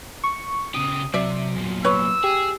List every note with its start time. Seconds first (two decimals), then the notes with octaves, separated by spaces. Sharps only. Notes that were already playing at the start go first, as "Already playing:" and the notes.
0.24 C#6
0.74 C#3 G4 D#6
1.14 C3 F#3 D5 E5
1.55 E2 A#2
1.84 B4 C#5 E6
2.24 G4 G#4